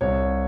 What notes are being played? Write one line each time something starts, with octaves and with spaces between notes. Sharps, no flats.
C2 C#5